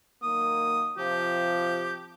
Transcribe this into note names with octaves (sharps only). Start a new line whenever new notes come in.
D#3 F#3 A#3 D#6
C3 F3 G4